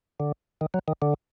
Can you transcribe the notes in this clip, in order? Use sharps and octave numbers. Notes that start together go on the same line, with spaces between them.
D3
D#3
F#3
D#3
D3